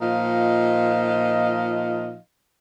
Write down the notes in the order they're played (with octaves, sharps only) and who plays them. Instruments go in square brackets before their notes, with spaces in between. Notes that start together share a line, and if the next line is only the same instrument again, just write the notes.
[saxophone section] A#2 F3 D#4 D#5 F5